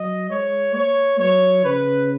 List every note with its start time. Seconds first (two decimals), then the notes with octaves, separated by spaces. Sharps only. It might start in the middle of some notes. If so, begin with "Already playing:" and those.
Already playing: F#3 D#5
0.30 G#3 C#5
0.74 A#3 C#5
1.19 F#3 C#5
1.65 C#3 B4